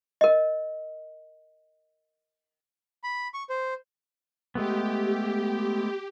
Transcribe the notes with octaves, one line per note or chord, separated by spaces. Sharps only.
A#4 D#5
B5
C#6
C5
G#3 A3 B3 G4